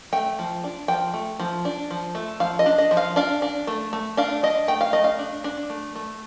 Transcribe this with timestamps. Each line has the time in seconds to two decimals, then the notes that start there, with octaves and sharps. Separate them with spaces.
0.13 A3 G5
0.39 F3
0.64 D4
0.88 F3 G5
1.14 A3
1.40 F3
1.65 D4
1.91 F3
2.15 A3
2.40 F3 F5
2.59 D#5
2.66 D4
2.78 D#5
2.91 F3
2.97 F5
3.16 D4 F5
3.42 D4
3.67 A3
3.93 A3
4.17 D4 F5
4.43 D4 D#5
4.68 A3 G5
4.81 F5
4.93 A3 D#5
5.04 F5
5.19 D4
5.44 D4
5.70 A3
5.95 A3